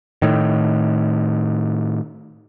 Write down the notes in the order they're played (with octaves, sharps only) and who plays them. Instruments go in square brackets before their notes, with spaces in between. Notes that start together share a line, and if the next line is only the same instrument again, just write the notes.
[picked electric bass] A2 D#3